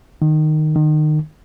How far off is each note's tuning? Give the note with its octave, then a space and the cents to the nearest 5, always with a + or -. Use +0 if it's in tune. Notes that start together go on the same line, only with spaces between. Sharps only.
D#3 -15
D#3 -30